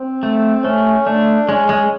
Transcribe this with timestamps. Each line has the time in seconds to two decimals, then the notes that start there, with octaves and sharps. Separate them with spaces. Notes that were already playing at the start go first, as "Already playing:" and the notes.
Already playing: C4
0.23 A3
0.64 A3 C#4
1.06 A3 D4
1.49 G#3 C#4
1.69 G#3